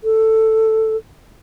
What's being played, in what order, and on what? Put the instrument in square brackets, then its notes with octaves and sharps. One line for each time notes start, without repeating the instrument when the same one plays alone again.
[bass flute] A4